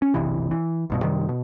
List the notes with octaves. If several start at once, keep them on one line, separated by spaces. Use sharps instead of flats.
C#4
F#1 B1 C3 E3
E3
B1 G2 B2
F#2 C3 D#3 G3
B2